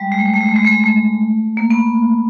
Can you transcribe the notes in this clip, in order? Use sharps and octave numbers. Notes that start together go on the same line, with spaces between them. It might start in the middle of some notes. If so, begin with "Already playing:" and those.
Already playing: G3 G#3
G#3
A3
G#3
A3
G#3
A3
G#3
A3
G#3
A3
A#3
B3